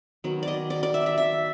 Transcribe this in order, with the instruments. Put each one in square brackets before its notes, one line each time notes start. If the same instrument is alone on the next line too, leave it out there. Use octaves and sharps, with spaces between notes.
[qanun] D#3 F#3 B3
D5
D#5
D5
D5
E5
E5
E5